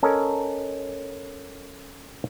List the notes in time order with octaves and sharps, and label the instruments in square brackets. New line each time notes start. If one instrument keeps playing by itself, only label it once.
[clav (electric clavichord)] C#4 A4 A#4 D#5